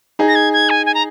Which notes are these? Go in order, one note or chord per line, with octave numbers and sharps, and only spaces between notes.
D#4 G#4
A#6
G#6
G#6
G#5
G#5
A#5